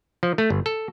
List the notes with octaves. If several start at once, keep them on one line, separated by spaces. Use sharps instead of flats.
F3
A3
G1
A4